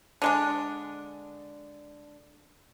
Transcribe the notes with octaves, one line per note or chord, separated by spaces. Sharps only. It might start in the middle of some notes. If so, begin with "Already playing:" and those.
D3 G#3 D4